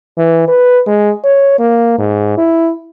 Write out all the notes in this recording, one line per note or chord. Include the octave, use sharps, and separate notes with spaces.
E3
B4
G#3
C#5
A#3
G#2
E4